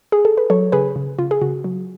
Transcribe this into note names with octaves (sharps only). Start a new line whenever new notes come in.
G#4
A4
B4
F#3 A4 C#5
C#3 G#4 B4
C#3
C#3 F4
G#4
C#3 F#4
F#3